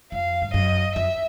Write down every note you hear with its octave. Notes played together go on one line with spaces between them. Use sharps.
F2 F5
G2
F#2 D#5
F2 E5